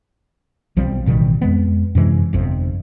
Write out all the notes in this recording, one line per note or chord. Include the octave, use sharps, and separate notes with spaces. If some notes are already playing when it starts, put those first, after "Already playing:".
B1 F3 G3 C4
A1 B2 D#3 G3
F2 G#3 B3
F#2 C3 E3 G#3
G1 F2 C3